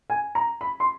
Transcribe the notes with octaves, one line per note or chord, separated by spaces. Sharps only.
G#5
A#5
B5
C6